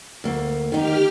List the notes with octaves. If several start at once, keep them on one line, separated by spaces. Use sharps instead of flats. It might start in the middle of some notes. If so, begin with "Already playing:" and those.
D2 A#3
D#3 D#4 G4 F6